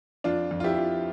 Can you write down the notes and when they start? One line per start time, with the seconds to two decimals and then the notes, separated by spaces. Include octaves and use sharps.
0.24 F2 D4 F4
0.51 F2
0.60 F4
0.64 E4 G4
0.78 F3